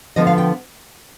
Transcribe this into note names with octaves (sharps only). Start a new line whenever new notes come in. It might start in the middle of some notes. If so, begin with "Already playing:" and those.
D3 F3 B3 D#5
F5
G5